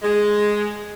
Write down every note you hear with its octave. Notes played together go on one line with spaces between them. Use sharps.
G#3